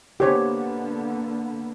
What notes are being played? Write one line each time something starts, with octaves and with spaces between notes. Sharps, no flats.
D3 A#3 B3 G4 C5 C#5